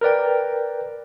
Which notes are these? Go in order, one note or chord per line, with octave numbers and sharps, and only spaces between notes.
A#4 B4 D5 G5